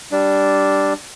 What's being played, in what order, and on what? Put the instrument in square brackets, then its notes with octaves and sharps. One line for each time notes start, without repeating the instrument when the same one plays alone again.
[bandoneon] G3 D4